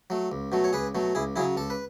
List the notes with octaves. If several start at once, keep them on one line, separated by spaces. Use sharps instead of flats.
F#3 A3
C#2
B2 F#3 A3
C#5
C#2 G#4 B4
B2 F#3 A3
C#2 E4 G#4
C#3 F#3 E4 G#4
C#2 A4
B4